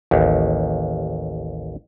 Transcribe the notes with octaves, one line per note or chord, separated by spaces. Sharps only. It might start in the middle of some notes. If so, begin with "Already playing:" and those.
A1 D#2